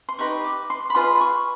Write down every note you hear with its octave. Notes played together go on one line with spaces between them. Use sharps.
C6
D#4 G4 B4 D#5 C#6
D6
C6
B5
F4 G#4 B4 D#5 C6
C#6